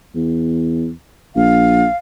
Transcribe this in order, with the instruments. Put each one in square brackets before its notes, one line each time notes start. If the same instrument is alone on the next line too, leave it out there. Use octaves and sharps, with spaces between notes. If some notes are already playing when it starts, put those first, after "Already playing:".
[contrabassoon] E2
[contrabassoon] A#1 [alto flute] F5